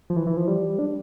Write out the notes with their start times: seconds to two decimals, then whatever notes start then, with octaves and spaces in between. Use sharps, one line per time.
0.10 F3
0.16 E3
0.27 E3
0.37 F3
0.48 G3
0.79 D4